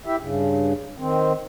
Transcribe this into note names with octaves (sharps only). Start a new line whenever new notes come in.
E4 G4 E5
G2 C#3
D#3 C4